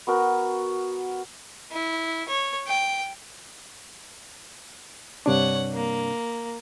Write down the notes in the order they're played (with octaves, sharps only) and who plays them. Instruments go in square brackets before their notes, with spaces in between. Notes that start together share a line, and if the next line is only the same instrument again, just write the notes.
[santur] B3 F#4 A#4 F#5
[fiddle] E4
C#5
G5
[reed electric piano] G2 C3 D4 [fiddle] C#5 F#5
[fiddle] A#3